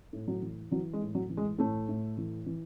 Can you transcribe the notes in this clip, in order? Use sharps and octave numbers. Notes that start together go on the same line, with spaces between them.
A2
F#3
E3
E3 F#3
G#3
A2
F#3
E3
G#3
A2 A3
A2
E3
E3